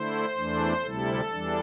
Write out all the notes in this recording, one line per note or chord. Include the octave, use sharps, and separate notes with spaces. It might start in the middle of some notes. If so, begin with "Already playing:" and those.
Already playing: D3 A3 E4 C5
E2 E3 A3 D4
D2 C3 G3 E4 A4
E2 E3 G3 D4